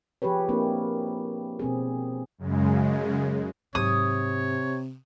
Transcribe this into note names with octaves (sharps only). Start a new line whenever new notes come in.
F3 G4 G#4 B4 C#5
A#3 C4 D4 E4
B2 C4 G#4
F#2 C#3 G#3
G#2 C3 F#3 C#5 D#6